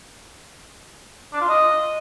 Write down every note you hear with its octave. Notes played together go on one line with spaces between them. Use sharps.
D4
F4
D#5